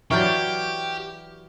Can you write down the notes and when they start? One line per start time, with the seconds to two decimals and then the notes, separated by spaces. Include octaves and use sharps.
0.11 E3 F#3 G4 D5 C#6 F6 G6